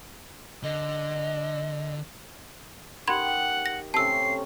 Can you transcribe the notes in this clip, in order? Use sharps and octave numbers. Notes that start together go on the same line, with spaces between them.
D3 D#5
D#3 G4 F#5 B5 C6 G#6
A#6
C3 A3 C#4 A5 E6 C7